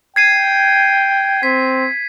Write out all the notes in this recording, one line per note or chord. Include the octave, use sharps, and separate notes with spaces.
G5 G#6 C7 D#7
C4 B6